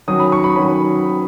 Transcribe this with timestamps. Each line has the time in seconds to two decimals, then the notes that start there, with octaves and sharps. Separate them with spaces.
0.08 D#3 F#3 C#4 D#6
0.19 B5
0.32 C#6
0.44 B5
0.56 D#3 F#3 C#4 B5